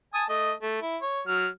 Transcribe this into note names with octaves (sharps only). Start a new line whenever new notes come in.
G#5 A5 D#6
A3 D#5
A3
E4
C#5
F#3 F6